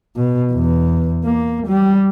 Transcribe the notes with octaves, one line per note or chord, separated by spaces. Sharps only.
B2
E2
A#3
G3